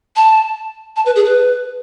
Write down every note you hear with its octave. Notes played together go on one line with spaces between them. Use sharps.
A5
A5
B4
G#4
B4